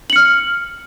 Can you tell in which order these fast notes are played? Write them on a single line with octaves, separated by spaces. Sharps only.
F#7 C#7 F6